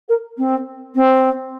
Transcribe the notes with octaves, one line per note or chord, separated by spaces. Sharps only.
A#4
C4
C4